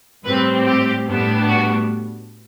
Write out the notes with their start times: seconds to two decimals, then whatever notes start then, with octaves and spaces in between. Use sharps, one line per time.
0.24 A2 G3 C4 B4
0.66 G4
1.06 A2 G3 B3 D4
1.48 F#4